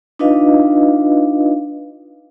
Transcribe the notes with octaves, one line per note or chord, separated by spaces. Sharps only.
D4 D#4 F4 B4 D#5 F5